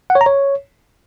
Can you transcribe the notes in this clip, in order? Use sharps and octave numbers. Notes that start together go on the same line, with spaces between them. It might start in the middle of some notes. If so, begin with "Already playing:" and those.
F#5
C#5
A#5
C#5